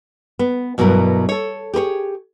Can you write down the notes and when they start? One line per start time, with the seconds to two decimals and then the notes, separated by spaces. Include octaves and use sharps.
0.39 B3
0.78 G2 B2 F#3 E4 A#4
1.29 A4 C#5
1.74 G4 G#4 B4 C#5